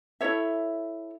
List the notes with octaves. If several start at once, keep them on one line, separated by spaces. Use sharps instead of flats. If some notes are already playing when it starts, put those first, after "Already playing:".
E4 A4 C#5 E5